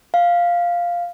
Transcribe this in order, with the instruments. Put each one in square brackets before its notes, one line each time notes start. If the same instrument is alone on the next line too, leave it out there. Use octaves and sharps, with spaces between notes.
[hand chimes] F5